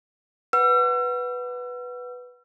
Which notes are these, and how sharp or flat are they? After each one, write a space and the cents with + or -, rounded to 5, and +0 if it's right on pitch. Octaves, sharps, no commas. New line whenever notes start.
B4 +0 F#5 +0 E6 +40